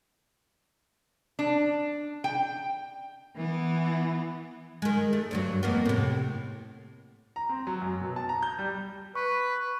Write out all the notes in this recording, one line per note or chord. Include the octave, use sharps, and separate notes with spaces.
D4
G5
E3 B3
D#3 G#3
A3
D2 G2 F#3
F2 A#3 B3
A2 C3
A#5
C4
F#3
F#2
B2
A5
A#5
G6
G3
B4 C#6